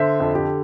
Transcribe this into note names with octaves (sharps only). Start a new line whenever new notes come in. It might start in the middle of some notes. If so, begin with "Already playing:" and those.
Already playing: D3 C5 E5
F2
G4